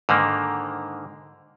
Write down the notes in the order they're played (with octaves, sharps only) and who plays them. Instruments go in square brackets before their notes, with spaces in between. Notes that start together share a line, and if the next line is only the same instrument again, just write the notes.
[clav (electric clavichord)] G#2 D3 D#3 A#3